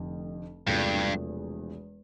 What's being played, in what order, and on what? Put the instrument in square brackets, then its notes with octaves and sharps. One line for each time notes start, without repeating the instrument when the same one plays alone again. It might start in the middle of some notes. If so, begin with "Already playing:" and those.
Already playing: [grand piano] F1 F2 D3 A3
[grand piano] E1 E2 C3 F3 A3 [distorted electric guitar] G2